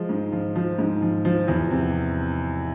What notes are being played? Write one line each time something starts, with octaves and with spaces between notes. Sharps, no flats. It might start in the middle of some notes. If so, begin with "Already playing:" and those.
Already playing: F3 G#3
G#2
F3
F3
G#2
F3
F3
E2
C3